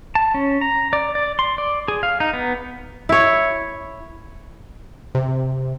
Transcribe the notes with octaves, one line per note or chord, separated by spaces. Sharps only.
A5
C#4
A#5
D5
D5
C6
D5
G#4
F5
D#4
B3
E4 C#5
C3